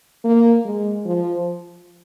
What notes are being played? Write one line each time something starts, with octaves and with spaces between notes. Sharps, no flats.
A#3
G#3
F3